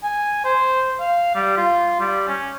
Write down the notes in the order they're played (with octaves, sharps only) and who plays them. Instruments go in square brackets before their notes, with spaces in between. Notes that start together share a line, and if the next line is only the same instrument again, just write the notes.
[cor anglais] G#5
C5
F5
G3
F4
G3
C#4